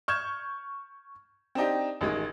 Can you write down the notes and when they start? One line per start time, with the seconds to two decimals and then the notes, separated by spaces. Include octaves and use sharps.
0.08 C#6 F6 G6 G#6 E7
1.55 C4 D4 D#4 G4
2.01 A1 D#3 G#3